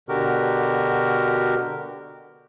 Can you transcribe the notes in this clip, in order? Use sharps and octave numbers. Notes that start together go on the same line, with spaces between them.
B2 D3 F#4 G4 A#4